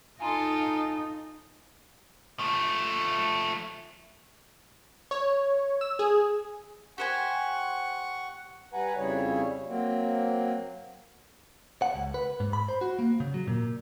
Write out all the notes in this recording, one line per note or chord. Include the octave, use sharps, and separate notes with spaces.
D#4 F4 A4 G#5 A#5 C6
F3 A3
C#5
E6
G#4
G4 C5 F#5 G#5 C#6
G3 B4 F#5 G#5 A#5
F2 C#3 G3 E4 C#5
F#3 A#3 C4
F#5
C#2
B4
G#2
B5
C5
F#4
A#3
C#3
F#3
A#2